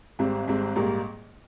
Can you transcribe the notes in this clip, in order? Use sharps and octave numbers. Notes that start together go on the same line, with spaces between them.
G#1 G#2 G3 C4
G#1 G#2 G3 C4
A#1 G#2 G3 A#3